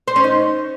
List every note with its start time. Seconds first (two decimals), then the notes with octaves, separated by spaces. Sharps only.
0.08 C5
0.16 C#4
0.24 D#4